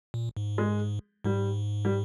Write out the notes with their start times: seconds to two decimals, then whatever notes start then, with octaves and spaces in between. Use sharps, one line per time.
0.14 A#2
0.37 G#2
0.58 G#3
1.24 G#2 G3
1.85 G3